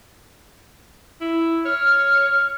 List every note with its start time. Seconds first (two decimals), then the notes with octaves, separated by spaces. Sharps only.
1.21 E4
1.65 C#5 F6